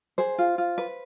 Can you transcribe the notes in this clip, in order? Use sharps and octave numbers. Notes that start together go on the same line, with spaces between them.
G#4 C5
F4
F4
B4